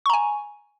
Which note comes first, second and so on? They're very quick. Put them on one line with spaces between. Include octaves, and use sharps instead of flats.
C#6 A#5 G#5